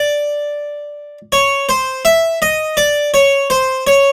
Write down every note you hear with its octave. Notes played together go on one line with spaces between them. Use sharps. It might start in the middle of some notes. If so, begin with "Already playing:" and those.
Already playing: D5
C#5
C5
E5
D#5
D5
C#5
C5
C#5